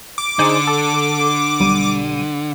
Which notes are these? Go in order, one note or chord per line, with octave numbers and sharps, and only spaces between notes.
D6
D3 D#4 G#4 C5
A4
B1 G3 D#7